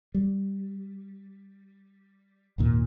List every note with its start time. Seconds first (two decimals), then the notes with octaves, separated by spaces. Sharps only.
0.14 G3
2.58 G#1 D#2 A#2